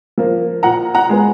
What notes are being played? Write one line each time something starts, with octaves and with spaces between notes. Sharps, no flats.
F3 A#3
A#2 F#5 A#5
F#5 A#5
G#3 B3